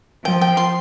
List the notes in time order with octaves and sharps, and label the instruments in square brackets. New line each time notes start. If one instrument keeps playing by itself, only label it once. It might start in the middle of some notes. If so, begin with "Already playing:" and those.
[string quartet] F3 [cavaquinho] G5
[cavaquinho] G5
C6